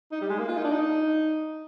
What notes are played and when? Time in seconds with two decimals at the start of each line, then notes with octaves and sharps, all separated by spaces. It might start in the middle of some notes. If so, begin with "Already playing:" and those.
0.12 D#4
0.21 G3
0.30 G#3
0.39 A#3
0.48 F4
0.57 D#4
0.64 D4
0.72 D#4